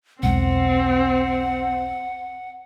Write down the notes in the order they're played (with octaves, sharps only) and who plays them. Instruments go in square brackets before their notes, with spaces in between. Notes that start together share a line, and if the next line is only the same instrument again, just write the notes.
[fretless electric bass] B1 E2 G#3 [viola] C4 [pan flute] F#5